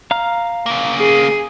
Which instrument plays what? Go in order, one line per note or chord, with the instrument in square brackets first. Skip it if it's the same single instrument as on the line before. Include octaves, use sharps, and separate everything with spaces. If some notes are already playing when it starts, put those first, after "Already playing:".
[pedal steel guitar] F5 A#5 F6
[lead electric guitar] C#3 A#3
[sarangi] G#4